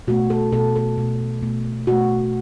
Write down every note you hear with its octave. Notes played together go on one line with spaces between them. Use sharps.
B2 A3 F#4
A4
B2 A3 A4
A4
B2 A3
B2 A3
B2 A3 F#4